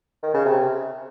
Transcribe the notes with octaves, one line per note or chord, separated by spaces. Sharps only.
D#3
C#3
C3